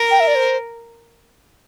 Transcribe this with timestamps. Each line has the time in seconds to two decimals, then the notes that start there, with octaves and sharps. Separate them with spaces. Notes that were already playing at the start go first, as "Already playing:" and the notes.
Already playing: A#4
0.11 G5
0.20 E5
0.27 D5
0.35 C5